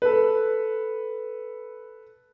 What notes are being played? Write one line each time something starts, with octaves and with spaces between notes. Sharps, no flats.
A4 B4